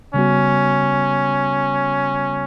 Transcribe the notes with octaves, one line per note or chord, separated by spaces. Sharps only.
C#3 G3 B3 C#4 F#4